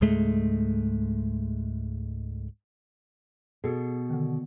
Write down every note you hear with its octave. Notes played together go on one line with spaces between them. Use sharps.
C#2 G#2 G#3 A3
B2 G#4 A4
D3 D#3